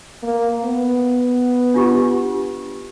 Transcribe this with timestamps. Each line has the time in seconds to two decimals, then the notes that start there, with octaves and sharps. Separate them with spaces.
0.23 A#3
0.64 B3
1.74 D4 F4 G4